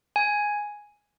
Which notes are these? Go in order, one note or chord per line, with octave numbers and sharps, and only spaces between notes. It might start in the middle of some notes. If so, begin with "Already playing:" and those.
G#5